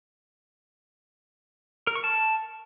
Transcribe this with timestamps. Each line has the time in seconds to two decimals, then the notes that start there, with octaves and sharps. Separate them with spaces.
1.87 A#4
1.95 C#6
2.04 A5